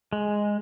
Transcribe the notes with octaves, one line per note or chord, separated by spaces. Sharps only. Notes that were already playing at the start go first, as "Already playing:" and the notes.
G#3